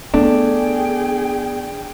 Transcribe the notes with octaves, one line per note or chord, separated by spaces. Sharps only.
A3 B3 D4 G#4 G5